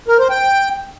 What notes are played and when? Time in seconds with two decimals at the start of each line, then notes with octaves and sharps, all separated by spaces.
0.08 A#4
0.19 C5
0.30 G5